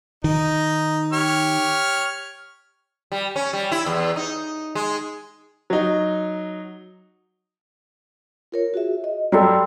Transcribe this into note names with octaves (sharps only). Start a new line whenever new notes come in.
D#3 D#4
G4 C#5 F6
G3
C#4
G3
E4
E2
D#4
G#3
F#3 D#4
F4 A#4 C#5
F#4 G#4 E5
D#5
F#3 G3 A4 G5 C6 E6